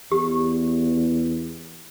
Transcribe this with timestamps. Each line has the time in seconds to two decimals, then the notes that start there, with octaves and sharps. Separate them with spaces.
0.12 E2 G4